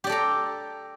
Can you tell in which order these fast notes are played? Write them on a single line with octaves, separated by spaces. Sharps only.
G4 D5 A4 A#5